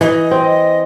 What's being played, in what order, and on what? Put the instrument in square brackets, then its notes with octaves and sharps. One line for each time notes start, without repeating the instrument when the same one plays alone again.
[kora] E3 [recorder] D#5
[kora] C4